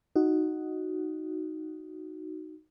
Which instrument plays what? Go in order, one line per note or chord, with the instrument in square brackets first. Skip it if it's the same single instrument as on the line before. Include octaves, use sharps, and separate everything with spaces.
[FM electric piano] D#4 F#4